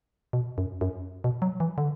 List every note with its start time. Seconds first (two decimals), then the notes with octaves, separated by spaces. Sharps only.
0.33 B2
0.58 F#2
0.81 F#2
1.24 B2
1.42 F#3
1.60 E3
1.78 D3